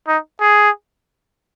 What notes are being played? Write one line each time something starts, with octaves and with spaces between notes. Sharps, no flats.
D#4
G#4